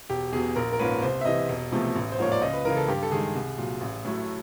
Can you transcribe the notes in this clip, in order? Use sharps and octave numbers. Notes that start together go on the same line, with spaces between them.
E1 G4
E2 B2 G#4
A#1 A#4
A#4
G#2 F3 A#3 C#4 B4
C2 C5
E5
C3 E3 D#5
E1
E2 C3 F3 A3
A1
C5
G#2 F3 A#3 C#5
D5
C#2 D#5
B4
C#3 E3 A#4
A4
G2 G4
A4
D#3 G#3 G#4
C2
A#2 F#3
A1
A2 F#3 A3